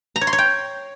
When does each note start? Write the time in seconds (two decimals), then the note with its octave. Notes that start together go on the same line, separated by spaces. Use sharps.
0.16 A#5
0.21 C#5
0.27 C6
0.33 C#5
0.38 G5